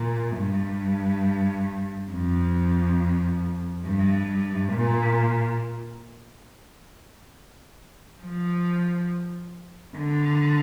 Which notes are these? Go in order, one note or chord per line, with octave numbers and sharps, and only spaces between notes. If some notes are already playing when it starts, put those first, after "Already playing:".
Already playing: A#2
G2
F2
G2
A#2
F3
D3